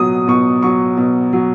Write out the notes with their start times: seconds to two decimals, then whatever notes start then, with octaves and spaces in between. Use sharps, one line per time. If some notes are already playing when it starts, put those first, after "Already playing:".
Already playing: B2 F#3 D#6
0.28 B2 C#6
0.62 F#3 C#6
0.97 B2
1.33 F#3